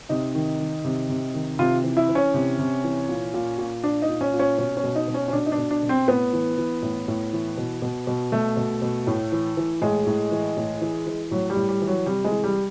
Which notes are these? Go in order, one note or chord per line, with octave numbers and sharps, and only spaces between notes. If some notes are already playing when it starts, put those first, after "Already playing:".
C3 D#4
D#3
D#3
C3
C3
D#3
C3 F4
E3
E4
E3
C#4
C3
C3
E3
A#2
A#2
A#2
A#2 D4
D#4
A#2
C#4
A#2
C#4
B2 C#4
C#4
B2
D#4
B2
C#4
C#4
B2 D4
D#4
D4
B2
D4
B2
C4
A2 B3
E3
E3
A2
A2
E3
B2
B2
B2
B2 A3
B2
B2
A2
E3
E3
A2 G#3
A2
E3
A2
E3
E3
A2 F#3
G3
A2
G3
E3
F#3
C3 G3
G#3
E3
G3